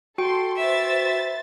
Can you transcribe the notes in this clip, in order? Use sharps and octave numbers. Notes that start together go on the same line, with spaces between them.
F#4 A4 G5 C6
B4 C5 E5 A6